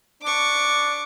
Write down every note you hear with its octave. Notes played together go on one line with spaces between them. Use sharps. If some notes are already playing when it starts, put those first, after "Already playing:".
D4 C#6 D6